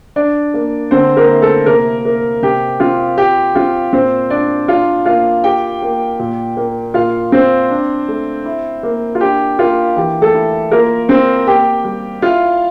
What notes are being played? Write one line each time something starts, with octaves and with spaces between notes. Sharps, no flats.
D4 D5
A#3
D3 C4 C5
A#3 A#4
E4
A3 A4
C3 A#3 A#4
A#3
C3 G4
C4 F4
F4 G4
C4 F4
A#2 C4 C5
D4 D5
D4 F4 F5
A#3 F4 F5
F4 G4 G5
A#3
A#2
A#3
A#2 F4 F5
C4 C5
D4
A3
E4
A#3
F4
D4 G4
A#3 F4
E3 G4
A3 A4
E4
A#3 F4 A#4
C4 C5
A#3 G4 G5
G3
E4 F4 F5